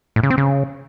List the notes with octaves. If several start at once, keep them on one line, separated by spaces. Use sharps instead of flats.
A2
C#3
C4
C#3